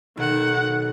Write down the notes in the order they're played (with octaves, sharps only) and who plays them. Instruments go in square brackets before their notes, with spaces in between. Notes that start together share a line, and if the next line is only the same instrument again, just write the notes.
[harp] B1 [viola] D#3 F#5